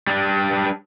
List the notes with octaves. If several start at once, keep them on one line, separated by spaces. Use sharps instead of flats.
G3 D4